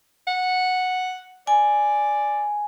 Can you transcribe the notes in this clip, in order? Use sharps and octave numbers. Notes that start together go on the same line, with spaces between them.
F#5
D5 G#5